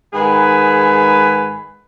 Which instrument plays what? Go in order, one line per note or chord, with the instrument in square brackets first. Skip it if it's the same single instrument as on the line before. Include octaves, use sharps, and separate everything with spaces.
[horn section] G#2 D#3 G#4 B4 G#5